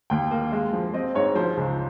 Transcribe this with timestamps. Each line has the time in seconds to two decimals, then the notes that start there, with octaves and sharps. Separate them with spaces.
0.10 D#2 G5
0.31 A#3
0.52 G#3
0.73 F3
0.93 C4 D#5
1.15 G#2 C#5
1.35 F3 C5
1.57 C#2